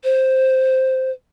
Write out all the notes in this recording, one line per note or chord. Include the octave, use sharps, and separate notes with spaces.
C5